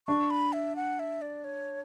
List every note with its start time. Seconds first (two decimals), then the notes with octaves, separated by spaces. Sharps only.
0.07 D4 C#6
0.30 B5
0.53 E5
0.76 F#5
0.99 E5
1.22 D5
1.44 C#5